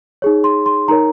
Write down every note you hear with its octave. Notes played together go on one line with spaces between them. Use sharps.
D#4 G#4 C#5
C6
C6
D#4 A#4 C#5 A#5